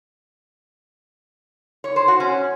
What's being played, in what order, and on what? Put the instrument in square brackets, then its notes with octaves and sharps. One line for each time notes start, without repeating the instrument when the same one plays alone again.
[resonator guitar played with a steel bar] C#5
C5
F#4
C#4